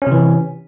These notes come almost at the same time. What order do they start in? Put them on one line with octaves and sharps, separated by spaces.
C#4 C3 E3